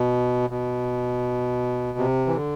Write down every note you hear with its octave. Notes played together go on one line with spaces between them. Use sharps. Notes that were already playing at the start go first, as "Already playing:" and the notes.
Already playing: B2
B2
C3
E3
D3